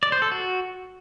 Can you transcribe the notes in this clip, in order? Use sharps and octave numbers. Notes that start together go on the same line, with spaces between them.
D5
C5
A4
F#4